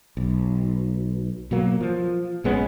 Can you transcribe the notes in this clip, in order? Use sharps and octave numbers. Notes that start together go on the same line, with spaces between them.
B1
B2 F#3 A#3
F3
A#1 G#3 B3 C#4